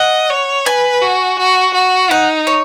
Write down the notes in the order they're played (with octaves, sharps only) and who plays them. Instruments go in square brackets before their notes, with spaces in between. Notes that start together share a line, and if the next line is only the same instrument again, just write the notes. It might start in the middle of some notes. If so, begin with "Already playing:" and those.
Already playing: [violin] D#5 [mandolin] F#5
[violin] C#5
[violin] B4 [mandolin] G#5
[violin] F#4
F#4
F#4
[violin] D#4 [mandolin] F#5
[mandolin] C#5